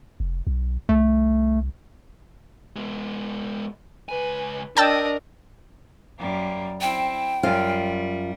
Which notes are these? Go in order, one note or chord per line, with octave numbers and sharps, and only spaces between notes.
F1
B1
C2 A3
G#3 B3
C#2 B4 G#5
D4 A#4 D#5 G5 A5 E6
F#2 G3 A#3
C4 E4 G5
F#2 G3 F4 F5